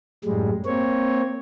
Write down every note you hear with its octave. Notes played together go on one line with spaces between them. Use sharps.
F#2 A2 G3 G#3
A#3 C4 C#5